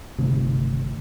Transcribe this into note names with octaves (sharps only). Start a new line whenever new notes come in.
G1 C3 D#3 A3